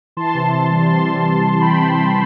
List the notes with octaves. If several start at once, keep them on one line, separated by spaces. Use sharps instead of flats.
E3 A5 C6
C3
C3
G3
C3 A5 C6
G3
G3
C3
E3 G5 B5
C3
C3